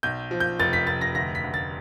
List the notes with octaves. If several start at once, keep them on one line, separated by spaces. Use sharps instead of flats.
B1 G6
F3
G6
F1 A6
B6
F1 A6
A#6
D2 A#6
B6
D2
A6